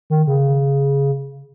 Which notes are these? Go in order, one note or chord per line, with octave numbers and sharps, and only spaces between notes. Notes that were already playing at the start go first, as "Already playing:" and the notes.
D#3
C#3